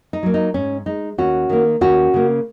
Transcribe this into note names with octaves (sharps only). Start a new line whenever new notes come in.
D#4
F#3 A#3
D#4
G#2 C#4
G#3 D#4
D#2 C#4 F#4
D#3 A#3
D#2 C#4 F#4
C#3 A#3